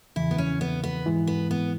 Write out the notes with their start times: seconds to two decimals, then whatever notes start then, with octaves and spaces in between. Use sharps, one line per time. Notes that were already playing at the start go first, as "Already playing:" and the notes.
0.16 E2 C#3 E3 E4
0.31 B3
0.38 C#4
0.61 B3
0.84 B3
1.06 G#2 E3 G#3 E4
1.27 B3
1.51 B3